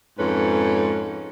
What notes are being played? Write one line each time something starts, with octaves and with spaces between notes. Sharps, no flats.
F2 G#2 C#4 A4 B4